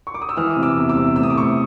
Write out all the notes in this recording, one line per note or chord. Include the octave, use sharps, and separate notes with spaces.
C#6
D6
D#6
E6
E3 D#6 F6
C3
D6 E6
E2
D6 E6
C3
A2 E6
D#6
D6
A2 C#6 D#6